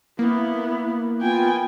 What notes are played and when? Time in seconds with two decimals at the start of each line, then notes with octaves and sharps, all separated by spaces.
0.19 A#3 B3 E4
1.22 B3 F4 G5 G#5